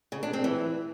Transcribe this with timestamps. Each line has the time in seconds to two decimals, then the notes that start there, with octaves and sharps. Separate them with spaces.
0.12 C#3
0.23 D4
0.33 C4
0.44 E3